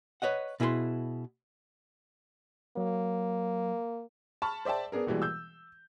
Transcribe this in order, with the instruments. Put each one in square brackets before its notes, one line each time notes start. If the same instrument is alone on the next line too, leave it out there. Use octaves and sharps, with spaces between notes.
[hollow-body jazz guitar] B4 C#5 D#5 F#5
B2 E4 G#4 A#4 B4 C6
[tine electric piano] F#3 [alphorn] A#3
[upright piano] A5 B5 C#6 F6
C5 D5 E5 G5 A5
B3 D4 G#4 A#4
A#1 B2 E3 G3 G#3
E6 G6